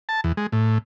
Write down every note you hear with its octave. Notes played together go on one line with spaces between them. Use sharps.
A5
E2
G#3
A2